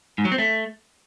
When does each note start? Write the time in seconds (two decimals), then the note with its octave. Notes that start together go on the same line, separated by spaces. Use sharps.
0.18 G#2
0.25 F#3
0.32 C4
0.38 A3